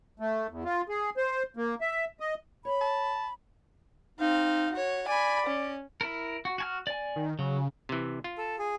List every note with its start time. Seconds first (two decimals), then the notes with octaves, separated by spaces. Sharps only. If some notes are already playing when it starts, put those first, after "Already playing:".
0.20 A3
0.50 E2
0.64 F4
0.89 G#4
1.17 C5
1.57 A#3
1.81 E5
2.20 D#5
2.65 C#5 B5
2.81 A5
4.20 C4 D#4 F5
4.72 F#4 C#5
5.08 D5 G#5 B5
5.46 C#4
6.01 E4 A#4
6.45 F#4
6.58 F#4 G#5 F6
6.87 D5 G#5
7.16 D#3
7.39 C#3 F#3
7.89 C3 E3
8.24 F4
8.38 A4
8.59 G#4